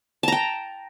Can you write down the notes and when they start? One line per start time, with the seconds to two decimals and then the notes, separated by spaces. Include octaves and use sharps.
0.23 A5
0.28 A#5
0.32 G5